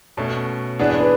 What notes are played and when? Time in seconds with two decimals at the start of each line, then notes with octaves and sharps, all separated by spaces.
0.17 B2 A3 C#4 C#5
0.79 E3 B3 D4 G#4 D5
0.90 D5
1.00 B4